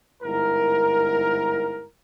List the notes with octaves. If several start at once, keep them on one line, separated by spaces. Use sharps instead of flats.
G1 G#2 E4 A#4